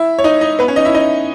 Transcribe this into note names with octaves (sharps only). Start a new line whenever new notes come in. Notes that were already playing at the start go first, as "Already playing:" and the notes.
Already playing: E4 E5
C#5
D#4 D#5
D#4 D#5
B3 B4
C#4 C#5
D#4 D#5
E4 E5
D#4 D#5